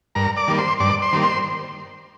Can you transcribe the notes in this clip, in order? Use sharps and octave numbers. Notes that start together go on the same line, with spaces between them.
G2 A#4 A#5
D5 D6
D#3 G3 A#3
C5 C6
G2 D5 D6
C5 C6
D#3 G3 A#3
C5 C6